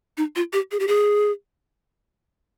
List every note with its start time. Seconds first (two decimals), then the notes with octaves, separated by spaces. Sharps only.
0.17 D#4
0.36 F4
0.53 G4
0.72 G#4
0.80 G4
0.88 G#4